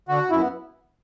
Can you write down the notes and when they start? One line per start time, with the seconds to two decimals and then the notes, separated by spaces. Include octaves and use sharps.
0.08 D3 F#4
0.31 F#2 E4
0.40 B3